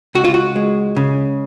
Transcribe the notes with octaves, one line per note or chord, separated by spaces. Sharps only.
C#2 F#4
F4
F#4
G#3
C#3